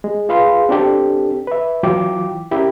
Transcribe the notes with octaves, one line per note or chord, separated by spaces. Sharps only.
G#3
F4 G#4 B4 F5 B5 C6
C4 D4 G4 A4
B4 E5
E3 F#3 F4 G5 D6
C#4 E4 G4 A#4